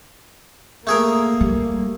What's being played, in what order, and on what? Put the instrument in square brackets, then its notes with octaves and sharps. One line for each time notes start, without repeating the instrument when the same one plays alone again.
[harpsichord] A3 G#4 A#4 [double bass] A#3
[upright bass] G3